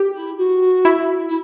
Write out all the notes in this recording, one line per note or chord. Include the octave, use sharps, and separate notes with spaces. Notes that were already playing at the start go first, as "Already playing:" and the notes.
Already playing: G4
E4
F#4
E4
E4